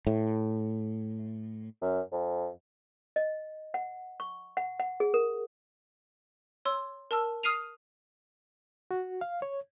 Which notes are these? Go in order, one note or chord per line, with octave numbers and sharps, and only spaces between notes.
A2
F#2
F2
D#5
F#5
C#6
F#5
F#5
G#4
A#4
C#5 C6 E6
A#4 A5 E6
D#6 F6 C7 D#7 F7
F#4
F5
C#5